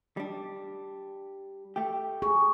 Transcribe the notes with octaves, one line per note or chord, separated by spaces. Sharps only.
G3 D4
A3 G4
G#4 C#6